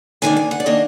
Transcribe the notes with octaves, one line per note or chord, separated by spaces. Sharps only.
G#2 D#3 A#3 D4 G#5
G#5
F#5
D5
D#3 A#3 D4 D#5